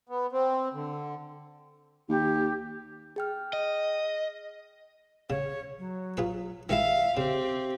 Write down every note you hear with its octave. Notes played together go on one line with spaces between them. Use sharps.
B3
C4
D3
D#2 G4
G#4 G5 F6
D#5
C#3 C#5
F#3
F4 G#4 B4
D#3 G#3 E4 E5 F5
C#3 C4 G4